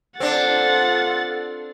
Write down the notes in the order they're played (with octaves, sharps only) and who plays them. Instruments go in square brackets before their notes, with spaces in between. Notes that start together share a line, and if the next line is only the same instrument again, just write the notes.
[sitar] C4 D4 [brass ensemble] F4 A4 [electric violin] F#5 A6